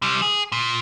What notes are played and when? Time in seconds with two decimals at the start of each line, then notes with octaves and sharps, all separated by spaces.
0.02 C3 G3
0.22 G#4
0.52 A#2